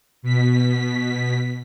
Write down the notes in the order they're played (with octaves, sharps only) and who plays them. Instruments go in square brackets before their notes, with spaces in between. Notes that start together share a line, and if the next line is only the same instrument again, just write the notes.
[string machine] B2 B6